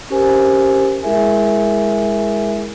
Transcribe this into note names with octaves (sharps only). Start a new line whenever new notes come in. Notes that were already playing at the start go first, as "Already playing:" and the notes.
C#4 G4 A#4 C5 G#5
G#3 E4 G#4 A#4 E5 G#5